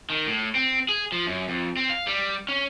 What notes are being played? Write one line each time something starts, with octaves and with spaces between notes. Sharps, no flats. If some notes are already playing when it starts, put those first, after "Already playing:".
D#3
A2
C4
G#4
F3
F#2
F2
C4
F5
G3
C#4